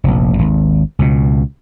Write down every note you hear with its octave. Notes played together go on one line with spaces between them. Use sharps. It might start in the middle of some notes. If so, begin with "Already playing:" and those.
F1 A#1
G#1 D#2
C#2 B2